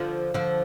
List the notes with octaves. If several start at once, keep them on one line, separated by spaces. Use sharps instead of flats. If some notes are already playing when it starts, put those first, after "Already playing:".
Already playing: D3 F3
D3 F3